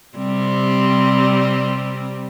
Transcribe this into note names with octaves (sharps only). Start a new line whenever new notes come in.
C3 G3 C4